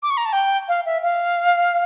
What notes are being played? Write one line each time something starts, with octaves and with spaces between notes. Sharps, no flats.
D6
C#6
A#5
A5
G5
F5
E5
F5